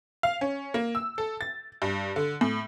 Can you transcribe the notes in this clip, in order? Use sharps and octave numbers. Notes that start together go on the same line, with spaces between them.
F5
C#4
A#3
E6
A4
A6
G2
D3
A2